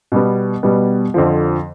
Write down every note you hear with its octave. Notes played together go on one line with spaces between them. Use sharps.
B2 G3 B3
B2 G3 B3
F2 D3 F3